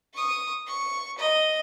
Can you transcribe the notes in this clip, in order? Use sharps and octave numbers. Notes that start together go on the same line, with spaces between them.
C#6 D#6
C#6
D#5